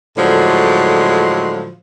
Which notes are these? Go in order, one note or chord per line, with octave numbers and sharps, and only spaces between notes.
A2 D3 F3 F#3 G#3